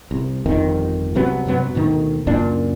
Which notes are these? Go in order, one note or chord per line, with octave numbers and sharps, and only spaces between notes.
C2
G1 F2 D#3
C2 C3 F#3 B3
G2 C3 F#3 B3
D2 B2 D#3
C#2 F#2 A#2 D4